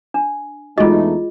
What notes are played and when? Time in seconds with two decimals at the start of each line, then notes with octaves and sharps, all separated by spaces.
0.14 D4
0.78 E2 G#3 A3 D#4 F4 F#4 G#4 D#5